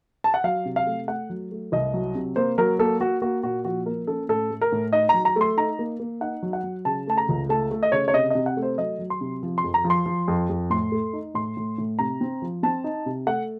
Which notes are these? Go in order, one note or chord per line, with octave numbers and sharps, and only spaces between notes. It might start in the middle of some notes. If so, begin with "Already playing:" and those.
A5
F#5
F#3 F5
C3
F5
A3
A3 F#5
F#3
A3
C2 D#5
F#3
C3
A#3 C5
F#3 A#4
A#3 A4
A#3 F#4
A#3 F#4
A#2 F#4
F3 F#4
A#3 A#4
C#4 A4
A2 A4
A3
A#4
A2
D#4 D#5
F#3 A#5
A#5
A3 C6
D#4 A#5
A#3
A#3
D#4 F#5
F#3
F#5
F#3
C#3 A5
A3 A5
A#5
C#2
A3 A5
A3
D#5
C#3 C#5
C#5
C3 D#5
C3 D#5
F#5
A3
C5
F#3 D#5
F#3
C6
C3
F3
C6
F2
A#5
F3
C6
F3
F2
F2
A2 C6
A3
D#4
A2 C6
A2
A2
C3 A#5
C4
F3
C4 A5
D#4
C3
A3 F#5